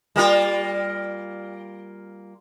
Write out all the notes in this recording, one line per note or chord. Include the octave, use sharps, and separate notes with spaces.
G3 A#3 F4